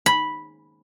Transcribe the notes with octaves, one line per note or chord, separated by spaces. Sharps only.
B5